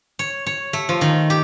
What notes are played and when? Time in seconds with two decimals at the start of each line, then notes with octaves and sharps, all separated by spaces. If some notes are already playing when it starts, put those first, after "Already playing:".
0.19 C#5
0.46 C#5
0.73 A3
0.89 F3
1.01 D#3
1.30 G4